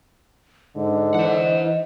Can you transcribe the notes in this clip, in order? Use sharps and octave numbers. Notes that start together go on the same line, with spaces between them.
G#2 D3 D#5
E3 C5 F#5